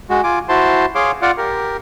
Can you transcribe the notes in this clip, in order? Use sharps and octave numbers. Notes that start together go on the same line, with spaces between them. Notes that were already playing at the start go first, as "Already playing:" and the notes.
G#3 F#4
F4 G#5 D6
E4 F#4 C5 A5 C6
G#4 C#5 F5 C6 D6
F4 D5 F5 F#5
G4 A#4